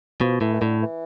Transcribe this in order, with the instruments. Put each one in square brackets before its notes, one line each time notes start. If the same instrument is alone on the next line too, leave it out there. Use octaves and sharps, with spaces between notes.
[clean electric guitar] B2 [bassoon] F3
[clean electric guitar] A2 [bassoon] E3
[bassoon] E3
[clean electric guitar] A2 [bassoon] D3
[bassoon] E3